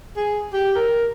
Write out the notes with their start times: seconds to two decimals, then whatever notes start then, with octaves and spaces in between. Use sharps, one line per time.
0.16 G#4
0.53 G4
0.75 A#4